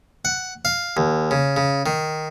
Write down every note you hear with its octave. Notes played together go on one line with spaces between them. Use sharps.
F#5
F5
D#2
C#3
C#3
D#3